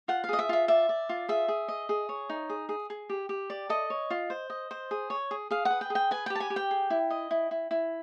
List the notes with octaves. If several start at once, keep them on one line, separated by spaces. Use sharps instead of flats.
F4 F#5
F5
G#4 D#5
E5
F4 E5
D5 E5
D5
F4
G#4 E5
G#4
D#5
G#4
C#5
D#4
G#4
G#4
G#4
G4
G4
D5
A4 D#5
C#5
F4
C5
D#5
C5
G#4
C#5
G#4
G#4 F5
F#5
B4
G5
G#4
G5
B4 G#5
G5
G4
A5
G#5
G4
G5
G#4
E4
D#5
E4
E4
E4